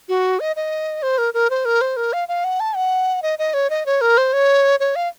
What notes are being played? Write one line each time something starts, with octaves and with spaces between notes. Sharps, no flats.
F#4
D#5
D#5
C5
A#4
A#4
C5
A#4
C5
A#4
F5
F5
F#5
A5
F#5
D#5
D#5
C#5
D#5
C#5
A#4
C5
C#5
C#5
F5